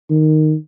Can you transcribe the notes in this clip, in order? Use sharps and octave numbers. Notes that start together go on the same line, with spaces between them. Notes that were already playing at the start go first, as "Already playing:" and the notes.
D#3